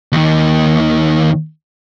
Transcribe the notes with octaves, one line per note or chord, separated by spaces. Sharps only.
D#2 D#3